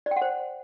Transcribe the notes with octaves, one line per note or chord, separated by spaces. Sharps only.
D5
G5
F#5
C5